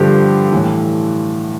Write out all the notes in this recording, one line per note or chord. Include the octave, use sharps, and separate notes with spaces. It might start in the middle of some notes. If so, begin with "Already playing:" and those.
Already playing: G2 D3 F3 G4
A2 E3